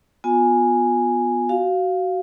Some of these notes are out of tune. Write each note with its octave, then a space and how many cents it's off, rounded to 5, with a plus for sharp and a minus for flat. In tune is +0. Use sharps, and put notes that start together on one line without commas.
B3 +0 F4 +35 G#5 +0
F#4 +20 F5 +0